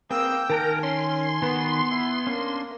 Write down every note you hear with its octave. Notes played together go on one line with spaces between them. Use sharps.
A#3 C4 G#4 B4 G5 E6
D#3 A#4 G#5 A5 F#6
C#4 C6
D#3 B3 F#4 B5
E4
A#3 C#4 D4